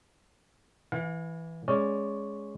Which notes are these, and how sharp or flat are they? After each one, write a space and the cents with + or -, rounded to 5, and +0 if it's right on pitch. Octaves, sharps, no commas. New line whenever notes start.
E3 +0 F5 +40
G#3 +0 C#4 +0 D5 +0